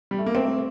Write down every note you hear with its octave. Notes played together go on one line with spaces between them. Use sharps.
G3
A3
A#3
A3 C4